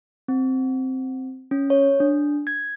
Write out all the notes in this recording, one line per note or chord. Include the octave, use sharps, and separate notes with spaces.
C4
C#4
C#5
D4
G#6